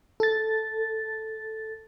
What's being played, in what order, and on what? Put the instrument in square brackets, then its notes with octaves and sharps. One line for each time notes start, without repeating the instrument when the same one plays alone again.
[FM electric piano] A4 A6